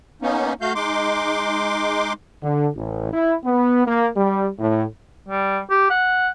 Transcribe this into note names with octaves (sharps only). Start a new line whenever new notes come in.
A#3 B3 C#4 D#4
A3 F#4 F5 G6
G#3 D#4 C6 D6
D3
A1
E4
B3
A#3
G3
A2
G3
G4
F#5